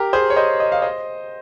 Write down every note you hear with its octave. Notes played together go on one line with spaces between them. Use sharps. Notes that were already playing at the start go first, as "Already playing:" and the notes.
Already playing: G4 A#4
G#4 C5
C#5
C5 D#5
D#5
F5
C5 D#5